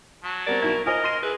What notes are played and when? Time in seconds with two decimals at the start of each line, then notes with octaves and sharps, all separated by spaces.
0.24 F#3 A5
0.47 G3 B3 C4 A#4 D5
0.62 B1 B2 E4 C#6
0.86 F4 A#4 C5 D#5 G#5 D#6
1.04 C6 A#6 D#7
1.23 E4 G#4 B4